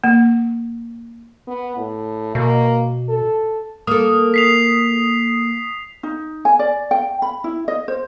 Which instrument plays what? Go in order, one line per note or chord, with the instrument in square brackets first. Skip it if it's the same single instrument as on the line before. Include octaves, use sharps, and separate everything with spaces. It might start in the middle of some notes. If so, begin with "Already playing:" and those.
[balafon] A#3
[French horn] B3
A2
[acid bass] B2 [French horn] A#3
[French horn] A4
[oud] A#3 A4 [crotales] D#6
[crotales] B6 C7 F7
[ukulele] D#4
G#5
D5
G5
B5
E4
D#5
C5